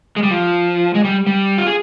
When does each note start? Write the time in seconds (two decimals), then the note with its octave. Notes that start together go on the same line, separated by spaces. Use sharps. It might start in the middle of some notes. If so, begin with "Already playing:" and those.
0.16 G#3
0.23 G3
0.30 F3
0.95 G#3
1.04 G3
1.27 G3
1.58 F4
1.67 G#4